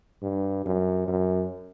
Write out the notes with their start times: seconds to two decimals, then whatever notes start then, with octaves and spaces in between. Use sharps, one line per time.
0.23 G2
0.66 F#2
1.08 F#2